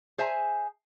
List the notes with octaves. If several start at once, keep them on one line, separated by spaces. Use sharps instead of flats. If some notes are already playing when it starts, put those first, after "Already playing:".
G#4 C5 E5 G#5 A#5